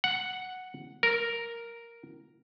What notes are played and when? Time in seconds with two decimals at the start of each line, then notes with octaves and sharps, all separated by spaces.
0.04 F#5
1.03 A#4